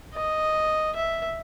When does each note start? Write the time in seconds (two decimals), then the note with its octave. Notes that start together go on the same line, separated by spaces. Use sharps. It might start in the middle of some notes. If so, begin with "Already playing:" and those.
0.15 D#5
0.96 E5